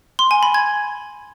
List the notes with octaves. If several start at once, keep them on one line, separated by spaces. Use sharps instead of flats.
C6
G#5
B5
G#6